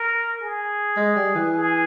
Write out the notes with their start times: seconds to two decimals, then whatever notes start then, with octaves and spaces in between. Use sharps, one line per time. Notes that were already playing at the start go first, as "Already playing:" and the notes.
Already playing: A#4
0.41 G#4
0.97 G#3
1.16 G3
1.35 E3
1.53 G#4